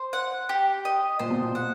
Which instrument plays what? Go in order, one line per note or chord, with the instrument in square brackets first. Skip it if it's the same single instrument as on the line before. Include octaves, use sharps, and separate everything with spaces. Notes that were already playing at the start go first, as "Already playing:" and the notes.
Already playing: [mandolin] C5
F#5
G4
D#5
[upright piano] A#2 [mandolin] C5
[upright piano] B2
A#2
[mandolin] F#5